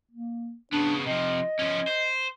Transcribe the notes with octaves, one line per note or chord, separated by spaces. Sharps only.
A#3
C#3 B3 D4
C3 F3 D#5
F3 C#4
C5